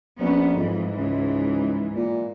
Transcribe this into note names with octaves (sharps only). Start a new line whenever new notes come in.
A#1 B3 C#4
F2 G#2 E3
C#2
A#2